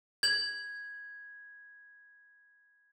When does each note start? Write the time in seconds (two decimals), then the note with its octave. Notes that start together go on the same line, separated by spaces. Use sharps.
0.23 G#6 F#7